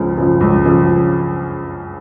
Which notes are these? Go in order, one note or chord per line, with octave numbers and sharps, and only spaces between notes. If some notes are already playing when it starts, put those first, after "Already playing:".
Already playing: C#2 C#3 F3
C#3 F3
C#2
C#3 F3